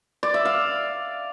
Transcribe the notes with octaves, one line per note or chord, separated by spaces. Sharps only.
D5
E5
F5